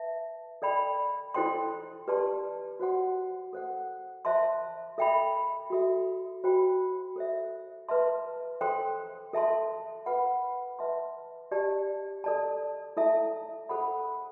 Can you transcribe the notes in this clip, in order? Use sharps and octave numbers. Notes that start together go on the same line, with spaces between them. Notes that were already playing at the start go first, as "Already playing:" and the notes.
Already playing: B4 E5 A5
A4 D5 G5 B5
E4 A4 C5 G5 C6
G4 B4 D5 A5 C6
F#4 C5 F#5 C6
A4 C5 F#5
C5 E5 A5 C6
A4 E5 G5 B5
F#4 A4 E5
F#4 C5 G5 B5
A4 C5 E5
B4 E5 A5 C6
A4 C5 G5 C6
A4 E5 A5 C6
B4 F#5 B5
B4 E5 A5 C6
G4 D5 A5
A4 D5 A5
E4 A4 E5 A5
A4 C5 F#5 B5